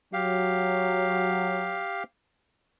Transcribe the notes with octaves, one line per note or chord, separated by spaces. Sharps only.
F#3 G4 F5